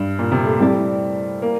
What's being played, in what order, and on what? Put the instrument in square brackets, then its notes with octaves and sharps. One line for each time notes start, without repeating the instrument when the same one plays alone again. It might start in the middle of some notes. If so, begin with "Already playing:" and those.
Already playing: [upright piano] G2
A#2
C3
A3
[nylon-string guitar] G3 C4 E4 A4 D5
[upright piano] A#3